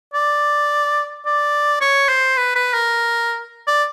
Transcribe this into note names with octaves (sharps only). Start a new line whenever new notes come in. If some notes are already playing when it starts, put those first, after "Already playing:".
D5
D5
C#5
C5
B4
B4
A#4
D5